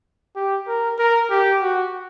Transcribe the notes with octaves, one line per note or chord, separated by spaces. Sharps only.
G4
A#4
A#4
G4
F#4